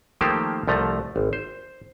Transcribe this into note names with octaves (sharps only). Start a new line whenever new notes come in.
D#3 F3 A3 A#3 G4 C5
C2 F3 A3 A#5
G#1
C5